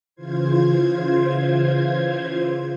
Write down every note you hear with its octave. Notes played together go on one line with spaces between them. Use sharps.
C#3 E3 F4 C5 G#6